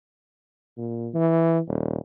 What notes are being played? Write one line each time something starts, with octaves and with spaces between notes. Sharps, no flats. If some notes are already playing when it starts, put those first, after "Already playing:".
A#2
E3
D#1